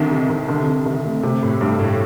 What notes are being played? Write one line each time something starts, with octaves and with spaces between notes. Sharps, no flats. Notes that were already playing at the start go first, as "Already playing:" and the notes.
Already playing: C2 D3 D#3
C3
C2
C2 D3
C2
C2
A3
C3 A3
A2
G2 A3
A2